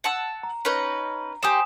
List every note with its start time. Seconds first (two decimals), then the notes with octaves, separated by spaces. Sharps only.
0.04 F#5 A5 E6
0.43 A#5
0.65 C#4 D#4 B4
1.43 C4 G4 G#5 D#6 E7